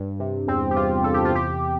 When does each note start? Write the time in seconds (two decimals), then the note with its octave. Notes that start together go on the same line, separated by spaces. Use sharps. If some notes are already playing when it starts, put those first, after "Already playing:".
Already playing: G2
0.20 C3
0.47 E2 C4
0.71 G4
0.76 E2 F4
1.04 E2 A4
1.14 G4
1.25 F4
1.32 C3 G4